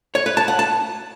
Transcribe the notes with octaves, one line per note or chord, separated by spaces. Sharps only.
C#5
B4
A5
F#5
A5